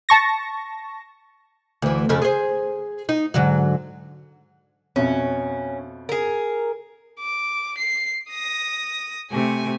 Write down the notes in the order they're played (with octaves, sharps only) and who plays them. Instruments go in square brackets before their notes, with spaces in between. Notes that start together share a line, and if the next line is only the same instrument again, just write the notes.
[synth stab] A5 C#6 A#6
[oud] D2 E3
F2 C#3 A3
G#4 C5
D#4
G#2 D3 F#3
[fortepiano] F2 B2 E5 [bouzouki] C#4
[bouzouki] G#4 A#4
[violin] D6
C7
D#6 A#6
[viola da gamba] C3 A3 [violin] G#5